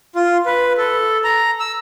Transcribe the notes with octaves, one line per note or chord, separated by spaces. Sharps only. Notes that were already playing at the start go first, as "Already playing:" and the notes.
F4
B4
A4
A#5
E6